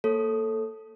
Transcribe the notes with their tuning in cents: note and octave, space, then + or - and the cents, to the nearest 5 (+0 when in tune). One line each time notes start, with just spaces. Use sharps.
A#3 -15 A4 +0 C#5 -20